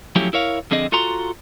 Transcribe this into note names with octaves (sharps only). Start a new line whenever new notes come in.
F3 F#3 A3 C#4 E4 G4
E4 A#4 C#5 F5
F2 D3 C4 G#4 D#5
F4 F#4 A4 A#5 C6